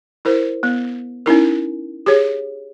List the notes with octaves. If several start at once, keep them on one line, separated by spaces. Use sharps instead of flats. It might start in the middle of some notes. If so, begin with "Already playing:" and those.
E4 A#4 C5
B3
C#4 D#4 E4 A#4
G4 G#4 C#5